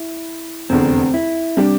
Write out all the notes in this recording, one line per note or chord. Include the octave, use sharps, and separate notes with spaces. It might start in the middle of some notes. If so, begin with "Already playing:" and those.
Already playing: E4
F1 E2 D3 C4
E4
C3 G3 D4 G4